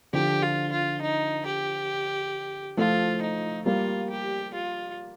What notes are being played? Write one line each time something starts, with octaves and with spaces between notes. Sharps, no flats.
D3 F3 G4
F4
F4
D#4
G4
F3 A3 F4
D#4
G3 A#3 F4
G4
F4